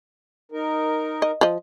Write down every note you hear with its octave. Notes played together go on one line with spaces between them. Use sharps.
D#4 A#4
D#5
F3 D#5